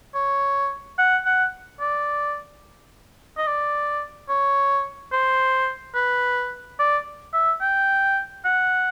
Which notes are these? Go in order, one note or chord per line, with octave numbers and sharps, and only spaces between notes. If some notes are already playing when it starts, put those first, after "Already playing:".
C#5
F#5
F#5
D5
D#5
D5
C#5
C5
B4
D5
E5
G5
F#5